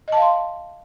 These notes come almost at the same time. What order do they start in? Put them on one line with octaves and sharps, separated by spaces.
D#5 A5 F5 C6